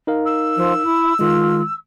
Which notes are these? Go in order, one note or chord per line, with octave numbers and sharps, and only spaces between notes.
D#4 A#4 F5
E6
F3
E4
D#3 G#3 F4